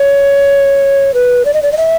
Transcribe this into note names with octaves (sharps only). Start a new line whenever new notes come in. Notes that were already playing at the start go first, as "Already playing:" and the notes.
Already playing: C#5
B4
D5
D#5
D5
D#5
E5